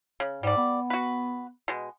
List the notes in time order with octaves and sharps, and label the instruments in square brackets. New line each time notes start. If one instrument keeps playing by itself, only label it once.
[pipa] C#3
[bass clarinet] G#2 [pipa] G3 D5
[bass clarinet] B3
[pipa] F#4 B4
B2 G#3